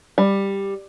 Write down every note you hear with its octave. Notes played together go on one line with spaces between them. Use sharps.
G3